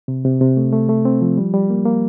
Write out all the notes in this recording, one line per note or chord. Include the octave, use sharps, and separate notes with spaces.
C3
C3
C3
A3
A3
A3
C4
F3
G3
G3
A#3
A#3